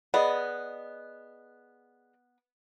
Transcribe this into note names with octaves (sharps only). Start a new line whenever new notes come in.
B3 G#4 D5 D#5